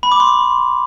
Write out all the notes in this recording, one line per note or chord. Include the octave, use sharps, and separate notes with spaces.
B5
D6
C6